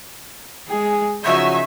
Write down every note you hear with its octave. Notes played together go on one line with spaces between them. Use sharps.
G#3 G#4
C#3 F3 F#3 D#4 F#4 E5 G#5 C#6